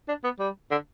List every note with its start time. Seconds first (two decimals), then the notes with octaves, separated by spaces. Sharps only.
0.08 D4
0.24 B3
0.39 G3
0.71 D3